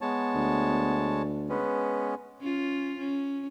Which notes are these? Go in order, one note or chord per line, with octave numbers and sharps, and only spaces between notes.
G#3 B3 C#5 A5
D2
G#3 B3 C#4 B4
C#4 F4
C#4